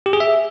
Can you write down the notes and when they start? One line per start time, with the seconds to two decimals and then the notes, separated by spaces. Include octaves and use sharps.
0.06 G4
0.13 G#4
0.20 E5